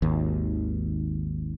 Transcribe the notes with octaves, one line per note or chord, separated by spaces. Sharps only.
G#1 D#2